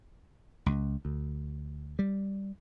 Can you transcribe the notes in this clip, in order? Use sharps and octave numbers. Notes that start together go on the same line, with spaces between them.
C#2
D2
G3